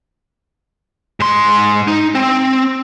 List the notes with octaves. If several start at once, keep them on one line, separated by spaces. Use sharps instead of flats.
G#2 C6
D#4
C4